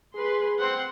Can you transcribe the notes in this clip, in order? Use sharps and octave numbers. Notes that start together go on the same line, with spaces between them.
G#4 B4 C6
C4 F#5 C6